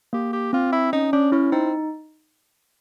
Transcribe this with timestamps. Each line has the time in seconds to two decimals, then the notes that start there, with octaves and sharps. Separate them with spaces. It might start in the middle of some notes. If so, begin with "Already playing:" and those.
0.13 A#3 G4
0.33 G4
0.53 C4 F4
0.73 E4
0.93 C#4 D#4
1.13 C#4 D4
1.32 C#4 E4
1.52 C4 D#4